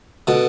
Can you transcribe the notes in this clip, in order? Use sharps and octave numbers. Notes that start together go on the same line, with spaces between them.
B2 D3